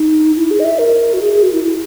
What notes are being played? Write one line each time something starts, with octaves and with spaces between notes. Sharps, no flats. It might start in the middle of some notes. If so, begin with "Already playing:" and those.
Already playing: D#4
E4
G#4
D#5
E5
A#4
F#4
G#4
G#4
F#4
E4
E4